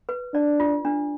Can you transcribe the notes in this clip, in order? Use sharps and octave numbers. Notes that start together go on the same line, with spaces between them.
B4
D4 D5
F4
D4